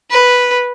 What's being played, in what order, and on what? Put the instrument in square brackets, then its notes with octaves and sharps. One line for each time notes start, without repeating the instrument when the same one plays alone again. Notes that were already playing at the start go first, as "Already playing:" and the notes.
[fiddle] B4